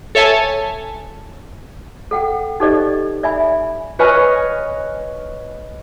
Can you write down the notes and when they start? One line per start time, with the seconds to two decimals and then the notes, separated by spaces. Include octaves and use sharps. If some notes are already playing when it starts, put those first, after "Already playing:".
0.15 A4 C#5 E5 G#5 A5
2.11 A4 F#5 G5
2.60 D#4 G4 A4 C5 D5 D#5
3.23 D5 E5 G#5 B5
3.99 B4 C#5 D#5 G#5 C#6 F6